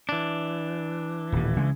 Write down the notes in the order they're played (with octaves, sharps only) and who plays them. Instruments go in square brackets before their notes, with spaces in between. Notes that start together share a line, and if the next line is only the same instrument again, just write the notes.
[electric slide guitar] E3 D4
[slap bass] D#1 A2
C#3 G#3